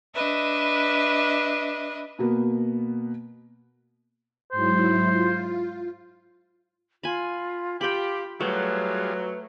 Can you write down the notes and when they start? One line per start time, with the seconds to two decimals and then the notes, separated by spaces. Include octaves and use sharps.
0.15 D4 B4 D#5 E5
2.19 B2 A#3 B3
4.52 G#2 F#3 E4 C5
5.05 F4
7.03 F4 G#5 B5
7.81 F4 G4 G5 B5
8.41 F#3 G3 A3 F4 G#4 B4